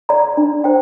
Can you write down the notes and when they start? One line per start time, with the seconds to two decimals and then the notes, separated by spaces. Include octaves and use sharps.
0.09 D5 A#5
0.37 D4
0.64 C5 G5